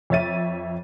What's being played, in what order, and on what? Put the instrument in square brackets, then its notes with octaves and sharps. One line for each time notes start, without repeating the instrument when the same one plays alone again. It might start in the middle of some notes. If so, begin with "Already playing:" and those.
[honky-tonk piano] F2 C#5 E5 A6 D#7